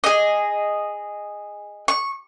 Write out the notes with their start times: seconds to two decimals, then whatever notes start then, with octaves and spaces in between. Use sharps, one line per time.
0.04 G#4 D#5
1.88 C#6